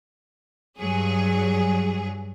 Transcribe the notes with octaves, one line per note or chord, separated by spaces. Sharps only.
G2 F#3 G#4